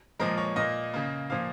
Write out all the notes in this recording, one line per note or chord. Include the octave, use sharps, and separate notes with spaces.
A#2 F3 G#3 A#4
C#5
A#2 A#3 D#5
C#3 A#3
A#2 F3 A#3 F5